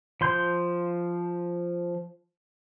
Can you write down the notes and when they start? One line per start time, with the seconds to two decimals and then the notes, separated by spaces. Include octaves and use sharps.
0.21 F3 C6 G6